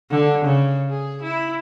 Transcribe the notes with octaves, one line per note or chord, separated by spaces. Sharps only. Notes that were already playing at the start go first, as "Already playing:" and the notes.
D3
C#3
G#4
E4